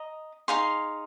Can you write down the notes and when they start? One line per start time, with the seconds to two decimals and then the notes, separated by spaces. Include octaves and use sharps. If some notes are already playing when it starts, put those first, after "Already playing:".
Already playing: D#5 A#5
0.48 D#4 G#4 F5 C6